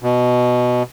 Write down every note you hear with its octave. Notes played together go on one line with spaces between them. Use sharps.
B2